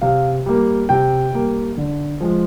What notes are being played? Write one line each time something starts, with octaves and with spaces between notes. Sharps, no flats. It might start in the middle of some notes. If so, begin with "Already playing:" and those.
C3 F5
G3 A#3
C3 G5
G3 A#3
D3
F3 G#3